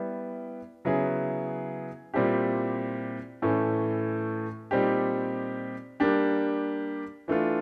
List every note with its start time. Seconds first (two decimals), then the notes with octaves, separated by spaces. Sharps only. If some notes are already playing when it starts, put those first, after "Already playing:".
Already playing: G3 B3 E4
0.85 C#3 F#3 B3 E4 G#4
2.14 A#2 G3 C4 E4 G4
3.42 A2 E3 A3 C#4
4.71 A#2 G3 C4 D#4 G4
6.00 G3 A#3 D4 G4
7.28 E3 A3 D4 F4